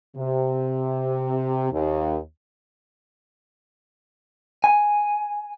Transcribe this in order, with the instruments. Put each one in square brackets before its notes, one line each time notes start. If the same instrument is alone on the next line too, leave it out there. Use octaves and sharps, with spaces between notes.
[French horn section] C3
D#2
[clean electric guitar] G#5